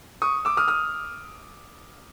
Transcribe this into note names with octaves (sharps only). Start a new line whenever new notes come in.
C#6 D#6
D6 E6
D#6 F6
D#6 F6